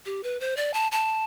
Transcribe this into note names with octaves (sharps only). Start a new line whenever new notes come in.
G4
B4
C5
D5
A5
A5